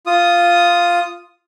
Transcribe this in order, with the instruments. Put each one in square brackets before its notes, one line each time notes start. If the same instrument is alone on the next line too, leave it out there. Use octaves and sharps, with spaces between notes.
[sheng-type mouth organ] F4 D#6